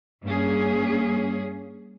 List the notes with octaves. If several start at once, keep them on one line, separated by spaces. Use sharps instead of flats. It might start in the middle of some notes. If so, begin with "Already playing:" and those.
G2 A#3 C#4 G#4